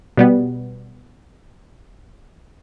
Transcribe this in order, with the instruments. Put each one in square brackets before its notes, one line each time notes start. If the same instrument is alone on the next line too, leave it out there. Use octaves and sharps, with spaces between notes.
[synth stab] B2 G3 B3